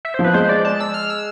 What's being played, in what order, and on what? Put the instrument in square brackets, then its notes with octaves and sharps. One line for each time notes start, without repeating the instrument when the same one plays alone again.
[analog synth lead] E5
[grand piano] F3 [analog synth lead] C5
[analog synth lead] B4
[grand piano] G#3 [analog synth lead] C5
[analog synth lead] D5
A5
E6
F6
E6